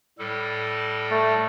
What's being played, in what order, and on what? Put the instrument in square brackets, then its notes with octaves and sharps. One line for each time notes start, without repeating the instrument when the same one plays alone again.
[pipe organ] A2 G3 A4
[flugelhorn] A3